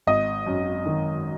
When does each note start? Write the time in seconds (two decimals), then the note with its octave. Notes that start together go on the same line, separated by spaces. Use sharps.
0.07 G#1 D#5
0.47 F#2
0.86 D#3